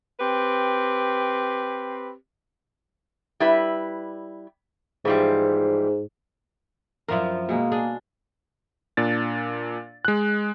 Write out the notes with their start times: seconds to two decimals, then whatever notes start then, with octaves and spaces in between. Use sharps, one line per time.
0.20 C4 G4 B4
3.40 G3 E4 B4
5.05 G#2 E3 F3 G3
7.08 F#2 F3 E4 F4 A#4
7.49 B2 G#3 A#3
7.72 D4 G#4
8.97 A#2 D4 A6
10.05 G#3 F#6